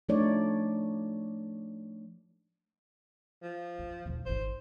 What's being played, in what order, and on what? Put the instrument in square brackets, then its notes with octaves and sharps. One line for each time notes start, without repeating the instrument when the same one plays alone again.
[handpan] F3 A3 D4 D#4 C#5 D5
[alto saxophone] F3
[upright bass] F#2
D#1 D2
[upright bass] D1 G#1 [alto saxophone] C5